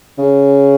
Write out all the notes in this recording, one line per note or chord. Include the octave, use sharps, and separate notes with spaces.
C#3